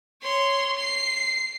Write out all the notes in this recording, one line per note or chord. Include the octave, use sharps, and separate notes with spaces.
C#5 C6
C7